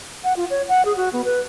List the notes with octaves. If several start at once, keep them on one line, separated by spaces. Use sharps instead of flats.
F#5
F4
C#5
F#5
G#4
F#4
B3
B4